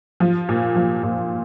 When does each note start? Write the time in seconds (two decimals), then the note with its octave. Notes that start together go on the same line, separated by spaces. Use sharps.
0.20 F3
0.49 A#2
0.76 F3
1.03 A#2